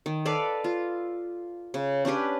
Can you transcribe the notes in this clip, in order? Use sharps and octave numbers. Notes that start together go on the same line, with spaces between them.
D#3
A4 B4 D5 F5
F4
C#3
C#4 D4 G4 B4